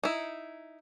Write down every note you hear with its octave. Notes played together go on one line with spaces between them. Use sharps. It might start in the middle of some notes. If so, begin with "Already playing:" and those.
D#4 E4